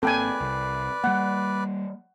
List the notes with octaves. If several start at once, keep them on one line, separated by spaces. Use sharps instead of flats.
G#1 A#3 C4 A4 B4 D5 G5 G#5
C2
G3 A#3 F#5